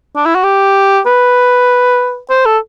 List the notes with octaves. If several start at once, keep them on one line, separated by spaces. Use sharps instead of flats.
D4
E4
F#4
G4
B4
C5
A4